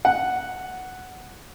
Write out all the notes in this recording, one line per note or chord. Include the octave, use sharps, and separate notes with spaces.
F#5